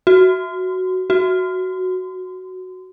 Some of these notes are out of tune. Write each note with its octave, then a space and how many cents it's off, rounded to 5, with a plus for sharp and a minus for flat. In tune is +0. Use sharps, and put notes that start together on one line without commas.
F#4 +5
F#4 +5